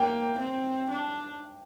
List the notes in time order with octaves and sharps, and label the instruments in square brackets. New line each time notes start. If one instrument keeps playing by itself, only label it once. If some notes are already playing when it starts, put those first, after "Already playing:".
Already playing: [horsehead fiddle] A#3 [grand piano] G5
[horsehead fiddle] C4
D4